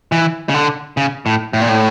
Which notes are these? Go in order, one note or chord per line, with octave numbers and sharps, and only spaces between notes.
E3
C#3
D3
C#3
A2
A2
A#2
A2